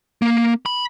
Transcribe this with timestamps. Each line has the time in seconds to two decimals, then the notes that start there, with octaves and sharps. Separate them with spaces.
0.22 A#3
0.66 B5